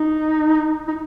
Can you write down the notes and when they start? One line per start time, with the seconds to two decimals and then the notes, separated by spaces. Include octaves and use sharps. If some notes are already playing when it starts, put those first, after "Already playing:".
Already playing: D#4
0.88 D#4